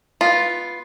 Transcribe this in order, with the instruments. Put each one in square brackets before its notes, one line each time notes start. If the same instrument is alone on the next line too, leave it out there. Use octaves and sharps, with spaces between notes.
[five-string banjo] B3 F4